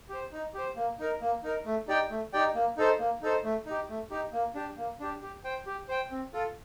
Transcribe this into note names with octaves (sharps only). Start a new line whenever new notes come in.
G4 C5
D#4
G4 C5
A#3
D#4 A#4
A#3
D#4 A#4
A3
D#4 G4 D5 G5
A3
D#4 G4 D5 G5
A#3
D#4 A4 C5
A#3
D#4 A4 C5
A3
D#4 G4
A3
D#4 G4
A#3
D4 G4
A#3
D4 G4
G4
C5 G5
G4
C5 G5
C4
F4 A4